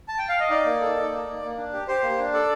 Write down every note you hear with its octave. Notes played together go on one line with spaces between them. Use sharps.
A5
G5
F5
D#5
D#4 D5
A#3
A4
D#4
A#3
A#3
A#3
D4
G4
G4 C5
A#3
D4
A4 D5